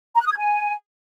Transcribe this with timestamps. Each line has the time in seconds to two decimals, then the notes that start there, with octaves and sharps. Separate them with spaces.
0.15 A#5
0.20 F#6
0.26 D#6
0.32 G#6
0.38 G#5